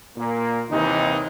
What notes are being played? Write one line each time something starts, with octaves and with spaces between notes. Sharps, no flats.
A#2 A#3
D#2 C3 D#3 E3 D#4